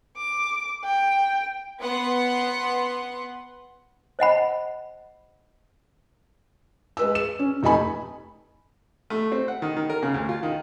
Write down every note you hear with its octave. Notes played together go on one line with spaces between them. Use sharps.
D6
G5
B3 F#5 C6
C5 D#5 F#5 B5
G#3 B4 E6
E7
C#4
F1 A3 D#4 G#5 B5
A3
C4
F#5
D#3
D#3
A#4
C#3
D2
F4
D#3